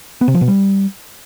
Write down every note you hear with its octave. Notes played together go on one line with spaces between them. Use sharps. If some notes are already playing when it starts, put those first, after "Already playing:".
B3
C3
F3
B2
G3